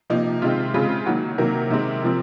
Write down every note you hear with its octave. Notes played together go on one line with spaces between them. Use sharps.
C3 F3 A#3 D#4
C3 D#3 G#3 C4 F4
C#3 G#3 C4 F4
D#3 F#3 A#3 F#4
C3 D#3 F#3 A#3 A#4
C3 D#3 G#3 C4
C3 F3 C4